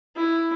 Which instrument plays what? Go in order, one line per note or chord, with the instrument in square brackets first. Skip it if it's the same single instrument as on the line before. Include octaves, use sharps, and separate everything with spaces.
[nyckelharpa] E4